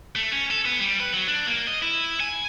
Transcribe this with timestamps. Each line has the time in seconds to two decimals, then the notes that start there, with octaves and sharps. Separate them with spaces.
0.15 A3
0.32 C#4
0.50 A4
0.66 B3
0.80 G3
1.00 B4
1.13 F#3
1.28 D4
1.46 A#3
1.67 D#5
1.82 E4
2.20 G#5